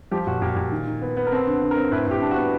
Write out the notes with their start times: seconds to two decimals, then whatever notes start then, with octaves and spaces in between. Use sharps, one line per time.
0.11 F3 G4
0.27 A#2 F#4
0.42 A#2 G4
0.56 A#2
0.72 D#3
0.87 D#3
1.01 B3
1.17 B3
1.27 A#4
1.32 C4 A4
1.47 D3
1.62 D3
1.71 A#4
1.77 C4
1.91 A2 B4
2.06 A2 G4
2.22 D4
2.31 F#4
2.36 B3